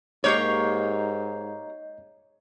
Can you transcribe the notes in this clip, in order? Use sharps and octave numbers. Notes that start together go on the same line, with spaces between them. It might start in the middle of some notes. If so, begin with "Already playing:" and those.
G#2 A#3 G4 C#5 D#5 A#5 G6 C7